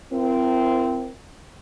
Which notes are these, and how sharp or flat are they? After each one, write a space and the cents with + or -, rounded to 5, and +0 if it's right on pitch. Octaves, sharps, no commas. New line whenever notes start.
C4 -15 E4 +45 A#4 +0